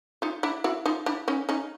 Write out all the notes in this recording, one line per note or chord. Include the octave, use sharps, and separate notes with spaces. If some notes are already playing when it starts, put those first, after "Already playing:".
D#4 F4
D4 E4
E4 F#4
D#4 F4
D4 E4
C#4 D#4
C#4 D#4